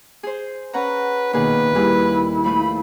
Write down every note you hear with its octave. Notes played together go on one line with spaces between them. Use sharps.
G#4 C5
C#4 B4 F#5 A#5
B1 A#2 D#3 G#4 B4
D#2 A#2 G3 E4 G#4
F3 A3 B4 B5